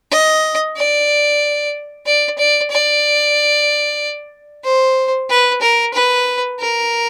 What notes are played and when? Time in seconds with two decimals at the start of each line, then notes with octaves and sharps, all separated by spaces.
0.11 D#5
0.76 D5
2.06 D5
2.39 D5
2.71 D5
4.65 C5
5.30 B4
5.62 A#4
5.94 B4
6.60 A#4